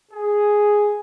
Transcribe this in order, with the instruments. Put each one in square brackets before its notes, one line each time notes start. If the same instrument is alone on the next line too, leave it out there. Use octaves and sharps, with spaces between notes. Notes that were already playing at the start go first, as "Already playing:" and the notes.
[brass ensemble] G#4